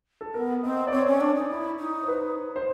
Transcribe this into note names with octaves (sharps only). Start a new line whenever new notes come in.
A4
B3 A#4
C4 D#5
D5
C4 C#5
C#4
D4
D#4
E4
D#4
C5
B4
C5